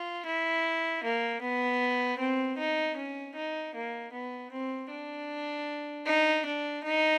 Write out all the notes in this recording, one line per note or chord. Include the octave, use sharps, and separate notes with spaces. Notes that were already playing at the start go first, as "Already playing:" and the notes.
Already playing: F4
E4
A#3
B3
C4
D#4
C#4
D#4
A#3
B3
C4
D4
D#4
D4
D#4